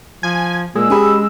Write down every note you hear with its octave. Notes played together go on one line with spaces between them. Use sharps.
F3 G#5
A#2 G#3 E6
C#4 G4 G#4 B5